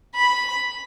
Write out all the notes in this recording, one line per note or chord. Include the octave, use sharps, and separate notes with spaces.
B5